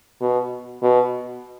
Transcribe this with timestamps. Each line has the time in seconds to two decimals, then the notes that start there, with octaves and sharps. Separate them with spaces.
0.21 B2
0.82 B2